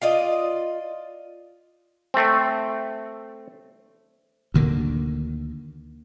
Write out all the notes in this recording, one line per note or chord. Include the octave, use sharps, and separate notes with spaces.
F4 D5 D#5
A3 C4
D2 D3 D#3 A#3